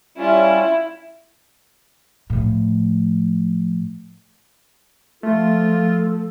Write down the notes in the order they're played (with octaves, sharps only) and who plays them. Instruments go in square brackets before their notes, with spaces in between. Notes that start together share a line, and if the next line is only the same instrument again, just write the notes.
[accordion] G3 C#4 F4 [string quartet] E4
[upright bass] A2 F3
[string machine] F3 [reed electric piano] A3 [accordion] F4 [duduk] A4